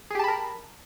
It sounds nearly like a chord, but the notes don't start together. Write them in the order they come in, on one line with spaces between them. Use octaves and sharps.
G#4 G4 A5 B5 A#4